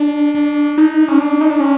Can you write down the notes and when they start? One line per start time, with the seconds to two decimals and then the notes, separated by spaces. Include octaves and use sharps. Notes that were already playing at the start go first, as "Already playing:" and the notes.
Already playing: D4
0.35 D4
0.78 D#4
1.08 C#4
1.18 D4
1.41 D#4
1.50 D4
1.60 C#4